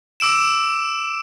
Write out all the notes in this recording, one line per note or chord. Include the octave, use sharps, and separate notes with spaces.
D6 E6 D7 E7